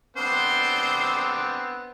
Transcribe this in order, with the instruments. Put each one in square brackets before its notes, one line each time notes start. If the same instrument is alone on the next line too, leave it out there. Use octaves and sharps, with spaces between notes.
[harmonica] B3 C4 D4 [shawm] C5